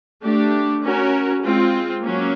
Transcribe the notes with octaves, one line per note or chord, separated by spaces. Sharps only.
A3 D4 G4
C#4 F#4 A#4
G#3 C4 F4
F#3 A#3 C#4